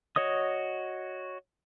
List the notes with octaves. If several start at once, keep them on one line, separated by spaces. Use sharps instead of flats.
F#4 C#5 D#5 D#6